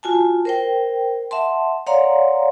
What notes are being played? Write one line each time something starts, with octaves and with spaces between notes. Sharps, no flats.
F4 F#4 G#5 A5
A#4 C5 G5
E5 F#5 A5 C6
C#5 D5 F5 F#5 A#5 C6